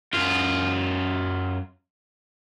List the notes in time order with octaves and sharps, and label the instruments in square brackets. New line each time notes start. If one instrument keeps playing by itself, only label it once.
[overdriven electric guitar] F#2 F4